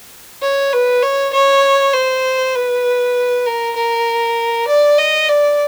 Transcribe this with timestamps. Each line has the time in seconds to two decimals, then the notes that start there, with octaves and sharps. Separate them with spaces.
0.42 C#5
0.73 B4
1.03 C#5
1.33 C#5
1.94 C5
2.55 B4
3.46 A#4
3.76 A#4
4.68 D5
4.98 D#5
5.29 D5